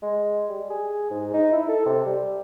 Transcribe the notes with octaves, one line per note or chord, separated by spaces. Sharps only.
G#3
G3
G#4
G#2
D#4
E4
A4
C3
G3